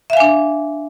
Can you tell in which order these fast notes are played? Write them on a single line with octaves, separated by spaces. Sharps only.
E5 F5 G#5 D4